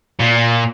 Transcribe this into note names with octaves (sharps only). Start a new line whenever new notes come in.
A#2